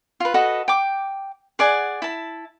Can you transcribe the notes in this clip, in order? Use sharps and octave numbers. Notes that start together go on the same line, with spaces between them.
F4 B4
F#4 A4 B4 D#5
G5 D6
G#4 D5 F#5 G#5
E4 A5